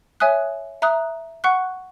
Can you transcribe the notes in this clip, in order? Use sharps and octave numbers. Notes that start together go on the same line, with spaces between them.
C#5 E5 G#5 D#6 F#6
E5 A#5 D#6 F#6
F#5 C#6 F#6